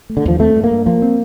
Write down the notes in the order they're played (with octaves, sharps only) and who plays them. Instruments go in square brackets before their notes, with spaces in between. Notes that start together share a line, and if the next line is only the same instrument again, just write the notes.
[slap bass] A3
[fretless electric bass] D3
[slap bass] D#2 [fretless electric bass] F3
[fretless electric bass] A3 [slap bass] C4
[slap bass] G2
[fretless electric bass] A#3
[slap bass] G2
[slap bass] F3 [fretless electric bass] A#3
[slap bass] C4